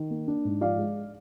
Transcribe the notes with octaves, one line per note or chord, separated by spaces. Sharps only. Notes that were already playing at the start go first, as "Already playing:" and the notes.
Already playing: D#3
A#3
D4
G#2
F3 D5 F5
G#3